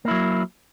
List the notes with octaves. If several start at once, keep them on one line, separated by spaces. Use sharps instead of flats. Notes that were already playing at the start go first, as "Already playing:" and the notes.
F#3 A#3 E4